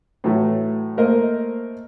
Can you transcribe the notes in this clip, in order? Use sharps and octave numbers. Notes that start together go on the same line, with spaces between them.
A2 E3 F#3 A3
A3 A#3 A#4 C5 D#5